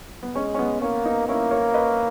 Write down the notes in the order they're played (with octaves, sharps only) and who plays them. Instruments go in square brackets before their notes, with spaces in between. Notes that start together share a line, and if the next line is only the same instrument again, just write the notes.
[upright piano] B3
[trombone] G#3 [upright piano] C#4
[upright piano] C#4
B3
[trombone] A#3 [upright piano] C#4
[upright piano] B3 D#4
[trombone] A#3 [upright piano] C#4 E4
[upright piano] A#4 C#5
B4 D#5